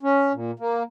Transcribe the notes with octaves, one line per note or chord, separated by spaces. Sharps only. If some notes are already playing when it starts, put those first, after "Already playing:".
C#4
A#2
A#3